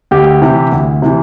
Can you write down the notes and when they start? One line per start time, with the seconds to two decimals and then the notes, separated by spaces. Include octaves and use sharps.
0.11 D2 G4
0.41 C3 E3
0.72 D2
1.02 C3 E3